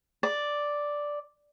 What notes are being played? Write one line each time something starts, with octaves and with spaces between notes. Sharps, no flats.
D5